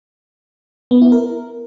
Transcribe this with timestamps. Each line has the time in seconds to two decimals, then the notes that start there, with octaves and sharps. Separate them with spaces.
0.91 B3
1.01 E4
1.12 A#4